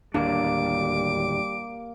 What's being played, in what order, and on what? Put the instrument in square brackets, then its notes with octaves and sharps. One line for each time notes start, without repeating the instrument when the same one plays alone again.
[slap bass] D1 D#2 D4 [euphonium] G3 [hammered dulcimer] A#3 [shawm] D6